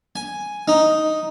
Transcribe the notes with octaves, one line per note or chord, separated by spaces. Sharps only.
G#5
D#4